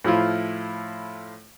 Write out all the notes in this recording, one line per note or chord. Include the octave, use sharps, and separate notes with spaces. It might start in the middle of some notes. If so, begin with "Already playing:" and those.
A2 F3 E4 F4